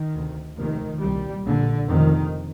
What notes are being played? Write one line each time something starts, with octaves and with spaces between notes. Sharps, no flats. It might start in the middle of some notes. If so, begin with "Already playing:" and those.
Already playing: D#3
D2 C3
F1 D#2 D#3
C2 A#2 G3
A#1 A#2 D3
F1 F2 C3 D#3